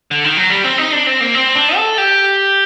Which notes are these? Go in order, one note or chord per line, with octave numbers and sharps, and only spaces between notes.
D3
D#3
F#3
G3
C4
D#4
D4
C4
A#3
C4
D4
A4
G4